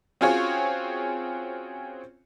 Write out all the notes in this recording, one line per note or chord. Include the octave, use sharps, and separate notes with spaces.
C4 C#4 F4 F#4 G#4 C#5